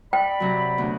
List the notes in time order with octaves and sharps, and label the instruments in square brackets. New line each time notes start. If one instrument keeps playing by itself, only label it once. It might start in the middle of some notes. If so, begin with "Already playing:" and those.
[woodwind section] D5 B5 [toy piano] G5
[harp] C3 F#3
D2 B3